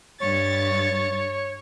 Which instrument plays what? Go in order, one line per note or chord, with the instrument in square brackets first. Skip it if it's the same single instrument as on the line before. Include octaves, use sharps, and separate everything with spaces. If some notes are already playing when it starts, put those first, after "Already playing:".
[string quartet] G2 A6 [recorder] C#5